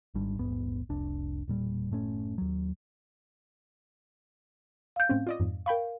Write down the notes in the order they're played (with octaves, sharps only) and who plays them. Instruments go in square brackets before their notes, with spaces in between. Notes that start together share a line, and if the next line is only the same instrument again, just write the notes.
[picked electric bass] G#1 G#2 G3 D4
D#1 A#1 G#2 B3
F1 C2 D4
E1 A#2 G3
F#1 A2 A3 C#4
D#2 F#3
[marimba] F5 G6
[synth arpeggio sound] A2 C4 C#4
F4 D5 D#5
F2 G#2
[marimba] A#4 F5 [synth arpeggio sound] G5 B5 C#6